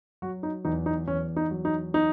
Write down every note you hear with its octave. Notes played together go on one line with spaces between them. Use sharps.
F#3 F#4
D#4
E2 D#4
D#4
E2 C#4
D#4
F#3
D#4
D#4